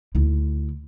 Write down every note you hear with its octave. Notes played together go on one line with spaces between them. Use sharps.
D2 E4